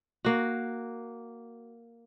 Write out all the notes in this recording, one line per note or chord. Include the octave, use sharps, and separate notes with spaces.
A#3 F#4